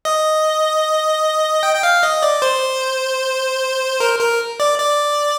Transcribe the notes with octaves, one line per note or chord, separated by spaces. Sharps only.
D#5
G5
G5
F5
D#5
D5
C5
A#4
A#4
D5
D5